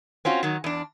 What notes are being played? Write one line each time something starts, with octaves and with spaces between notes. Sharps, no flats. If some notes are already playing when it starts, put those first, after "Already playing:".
C4 C#4 F4 F#4
D#3 F#3
E2 D4